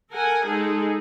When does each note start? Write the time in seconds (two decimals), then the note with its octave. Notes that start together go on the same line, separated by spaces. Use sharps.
0.12 A4 A#4 F#5 G#5
0.45 G#3 D#4 G#4 A4